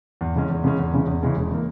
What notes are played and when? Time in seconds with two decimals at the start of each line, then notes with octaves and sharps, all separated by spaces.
0.21 E2
0.35 C#3 E3 G#3 C#4
0.50 E2
0.64 C#3 E3 G#3 C#4
0.79 E2
0.94 C#3 E3 G#3 C#4
1.07 E2
1.22 C#3 E3 G#3 C#4
1.37 E1
1.52 E3 A#3